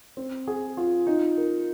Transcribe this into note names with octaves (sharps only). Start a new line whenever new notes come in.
C4
G#4
F4
D#4
A#4